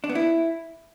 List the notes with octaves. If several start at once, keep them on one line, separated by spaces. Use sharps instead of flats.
D4
B3
E4